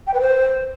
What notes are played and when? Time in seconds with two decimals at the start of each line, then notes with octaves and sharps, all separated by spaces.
0.07 G5
0.14 B4
0.21 C5